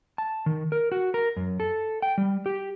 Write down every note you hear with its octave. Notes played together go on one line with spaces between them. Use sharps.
A5
D#3
A#4
F#4
A#4
F#2
A4
G5
G3
G4